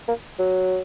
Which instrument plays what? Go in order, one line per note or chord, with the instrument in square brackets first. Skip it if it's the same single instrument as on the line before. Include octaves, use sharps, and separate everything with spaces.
[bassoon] A#3
F#3